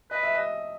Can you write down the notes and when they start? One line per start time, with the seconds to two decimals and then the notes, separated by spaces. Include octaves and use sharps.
0.11 B4 D#5
0.23 E5
0.35 D#5